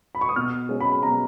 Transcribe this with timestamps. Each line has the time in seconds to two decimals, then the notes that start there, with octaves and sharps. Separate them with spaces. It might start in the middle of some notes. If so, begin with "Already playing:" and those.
0.15 B5
0.21 C#6
0.29 D#6
0.36 B2 F6
0.69 G#3 C#4
0.81 B5
1.03 B2 A#5